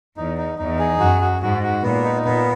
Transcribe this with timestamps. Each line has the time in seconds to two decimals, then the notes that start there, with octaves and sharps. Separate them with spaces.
0.17 E2 D#4
0.37 D#4
0.59 E2 D#4
0.79 G#4
1.00 F#2 F#4
1.21 F#4
1.41 G#2 F#4
1.63 F#4
1.83 A#2 B3
2.04 D#4
2.25 A#2 B3